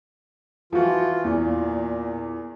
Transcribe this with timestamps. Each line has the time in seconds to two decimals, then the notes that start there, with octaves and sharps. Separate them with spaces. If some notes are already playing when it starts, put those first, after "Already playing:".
0.73 E3 F3 F4 F#4
1.24 E2 A#2